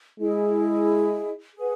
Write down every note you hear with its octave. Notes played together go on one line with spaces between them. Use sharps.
G#3 E4 G#4 D#5
G#4 B4 F#5